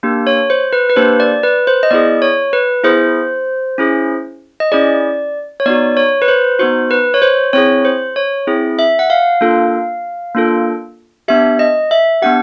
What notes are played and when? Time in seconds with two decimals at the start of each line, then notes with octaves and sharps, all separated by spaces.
0.03 A#3 D4 G4
0.27 C#5
0.50 C5
0.73 B4
0.90 B4
0.96 A#3 D4 G4 C5
1.20 D5
1.43 B4
1.67 C5
1.83 D#5
1.91 B3 E4 G#4 D5
2.22 C#5
2.53 B4
2.84 B3 E4 G#4 C5
3.78 C#4 E4 G#4
4.60 D#5
4.72 C#4 E4 G#4 D5
5.60 C#5
5.66 B3 D#4 F#4 D5
5.97 C#5
6.22 B4
6.28 C5
6.59 B3 D#4 F#4 C5
6.91 B4
7.14 C#5
7.22 C5
7.53 C4 E4 G#4 C#5
7.85 C5
8.16 C#5
8.47 C4 E4 G#4
8.79 E5
8.99 F#5
9.10 F5
9.41 A#3 D4 F4 A4
10.35 A#3 D4 F4 A4
11.28 B3 D4 G4 E5
11.59 D#5
11.91 E5
12.22 B3 D4 G4 F#5